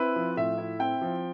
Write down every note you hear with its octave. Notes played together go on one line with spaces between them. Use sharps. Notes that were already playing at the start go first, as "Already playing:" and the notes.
Already playing: C4 E4 B4
F3
A2 E5
E4
C4 G5
F3